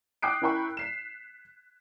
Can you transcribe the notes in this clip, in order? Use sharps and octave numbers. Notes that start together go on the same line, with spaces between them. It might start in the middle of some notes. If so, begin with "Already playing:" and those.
G5 D6 D#6 F#6 C7 D7
C#4 E4 A#4 G5 B5 C#6
B6 C7 E7